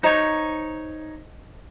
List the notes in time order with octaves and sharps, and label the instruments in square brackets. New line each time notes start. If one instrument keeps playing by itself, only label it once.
[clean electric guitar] D#4 C#5 [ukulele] C5 D#5 A#5